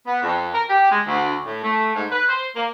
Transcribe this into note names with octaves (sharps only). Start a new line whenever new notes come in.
B3
F2
A#4
G4
G#3
D2
A2
A3
G#2
B4
C5
A#3